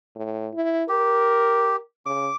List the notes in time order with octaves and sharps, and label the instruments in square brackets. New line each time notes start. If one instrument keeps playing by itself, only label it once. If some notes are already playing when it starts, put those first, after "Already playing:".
[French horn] A2
E4
[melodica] G4 [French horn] A#4
[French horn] C#3 [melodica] D6